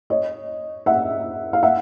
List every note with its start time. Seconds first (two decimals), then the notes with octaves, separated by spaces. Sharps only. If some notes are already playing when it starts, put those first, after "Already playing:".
0.10 C#5 D#5
0.86 E5 F#5
1.53 F5
1.63 E5 F#5